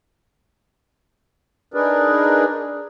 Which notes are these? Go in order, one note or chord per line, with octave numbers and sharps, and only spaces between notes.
D4 D#4 G#4 A#4 B4 D5